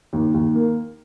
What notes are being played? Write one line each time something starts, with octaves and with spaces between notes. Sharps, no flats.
D#2
D#2
A#3